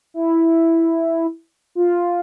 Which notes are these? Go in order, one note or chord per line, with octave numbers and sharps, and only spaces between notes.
E4
F4